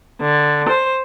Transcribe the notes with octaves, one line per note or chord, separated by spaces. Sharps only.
D3
C5